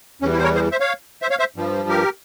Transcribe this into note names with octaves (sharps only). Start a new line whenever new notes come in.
E2 E3 G3 C#4
E4
C5
A#4 C#5
G#4 C5
C5 E5
C#5 F5
C5 E5
C#5 F5
C5 E5
G2 F3
G4 A#4